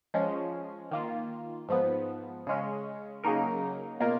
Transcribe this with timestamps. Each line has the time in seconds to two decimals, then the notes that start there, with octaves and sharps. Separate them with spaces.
0.14 F3 G#3 C#4
0.91 D#3 A#3 F4
1.69 G#2 F3 B3
2.47 C#3 G#3 C#4
3.24 C#3 F#3 A#3 D#4 A#4
4.00 B2 A#3 F4 A#4